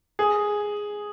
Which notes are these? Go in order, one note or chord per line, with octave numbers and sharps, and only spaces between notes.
G#4